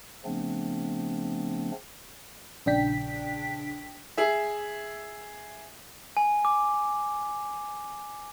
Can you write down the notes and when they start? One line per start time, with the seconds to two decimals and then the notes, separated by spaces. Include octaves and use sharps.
0.25 C#3 F3 A3 B3 C4 D4
2.66 A#1 C#3 D4 G5 B6
4.17 G#4 E5
6.17 G#5
6.45 D6